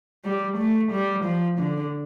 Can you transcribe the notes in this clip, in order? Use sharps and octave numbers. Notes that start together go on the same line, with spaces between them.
G3
A3
G3
F3
D3